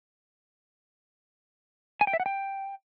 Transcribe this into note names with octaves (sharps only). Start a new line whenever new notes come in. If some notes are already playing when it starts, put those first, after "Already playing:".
G#5
G5
E5
F#5
G5